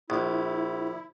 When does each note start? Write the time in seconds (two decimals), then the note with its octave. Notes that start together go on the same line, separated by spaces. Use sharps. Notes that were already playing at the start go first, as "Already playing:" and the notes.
0.10 A#1 E4